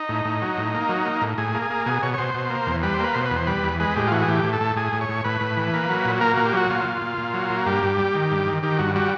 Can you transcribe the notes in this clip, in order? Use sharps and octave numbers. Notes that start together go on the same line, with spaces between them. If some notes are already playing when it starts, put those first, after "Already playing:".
Already playing: D#4
A2
A2
F#3
A2
A#3
F#3
A#3
A2
A2 G#4
A#3
G#4
A#3
B2 G#4
B2 C#5
C#5
B2 C5
B2
A#3
E2
G3 B4
C5
A#3 B4
B2 C5
B4
E2
C5
G3 B4
E2
G#3 B4
A2 G4
F4
E3 F#4
G#4
A2 G4
A2
A4
A2
A2 G#4
A2
C#5
A2
A2 B4
A2
E3
A#3
F#3
A#2
A#3 A#4
A#2 F#4
G4
F#3 F#4
A#2 F4
A#2
A#2
A#2
F#3
A#3
G2 G4
G2
G3
D#3
G2
D#3
D#3 G4
G2 F#4
G3 F#4